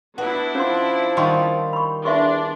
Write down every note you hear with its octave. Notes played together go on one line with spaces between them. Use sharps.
B3 D4 E4 F#4
F3 C#4 C6
D#3 G3 F4 F#5 C6 C#6
B5 C#6
E2 D4 E5 C6 C#6